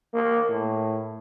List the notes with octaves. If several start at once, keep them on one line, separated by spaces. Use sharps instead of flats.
A#3
A2